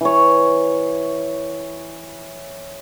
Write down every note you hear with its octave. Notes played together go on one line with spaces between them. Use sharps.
E3 C#5